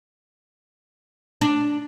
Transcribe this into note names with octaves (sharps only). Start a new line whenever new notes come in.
D4